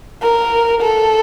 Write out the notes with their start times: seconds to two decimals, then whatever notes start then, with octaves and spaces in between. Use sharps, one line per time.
0.22 A#4
0.81 A4